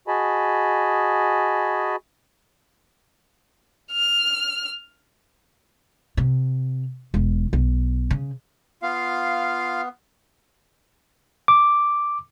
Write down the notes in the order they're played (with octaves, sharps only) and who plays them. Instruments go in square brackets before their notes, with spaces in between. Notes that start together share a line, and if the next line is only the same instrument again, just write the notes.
[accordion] F#4 G#4 D#5 G#5 A5 B5
[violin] F6
[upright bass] C3
E1
B1
C#3
[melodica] B3 [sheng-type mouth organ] F4 F5
[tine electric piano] D6